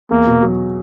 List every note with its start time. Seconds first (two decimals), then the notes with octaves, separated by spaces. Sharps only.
0.10 E2 A#3
0.27 B2
0.43 F#3